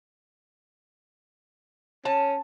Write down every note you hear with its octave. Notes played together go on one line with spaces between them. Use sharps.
C#4 A5